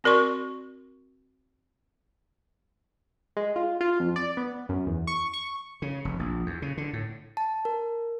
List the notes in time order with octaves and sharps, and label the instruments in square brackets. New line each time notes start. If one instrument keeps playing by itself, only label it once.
[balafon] C4 F#4 A#4 D5 C6 C#6
[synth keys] G#3
F4
F4
F2
D5
B3
F#2
E2
C#6
C#6
[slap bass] C#3
F1
A#1
E2
C#3
D3
A2
[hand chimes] A5
A#4